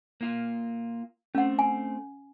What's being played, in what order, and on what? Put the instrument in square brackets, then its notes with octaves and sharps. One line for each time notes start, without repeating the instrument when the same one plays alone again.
[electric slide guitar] A#3 F4
[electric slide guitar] A3 C4 [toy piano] C#4 F#5
[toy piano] G#5